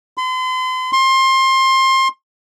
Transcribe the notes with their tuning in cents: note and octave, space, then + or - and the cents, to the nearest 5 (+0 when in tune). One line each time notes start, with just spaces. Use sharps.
C6 -40
C6 +25